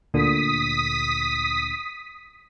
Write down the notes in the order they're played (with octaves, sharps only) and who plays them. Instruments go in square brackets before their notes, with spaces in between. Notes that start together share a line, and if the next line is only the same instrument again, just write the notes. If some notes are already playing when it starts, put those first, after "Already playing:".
[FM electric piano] D2 A#2 D3 [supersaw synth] D#6 B6